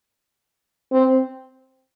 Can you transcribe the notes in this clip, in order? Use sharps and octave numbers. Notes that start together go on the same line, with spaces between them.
C4